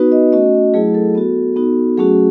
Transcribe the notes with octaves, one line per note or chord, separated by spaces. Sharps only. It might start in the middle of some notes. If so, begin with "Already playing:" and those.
Already playing: B3 D#4 F#4 B4
D#5
A3 C#4 F#4 D#5
F#3 A3 E4 G#4
A4
B3 F#4
B3 D#4 F#4
F#3 A3 C#4 F#4 G#4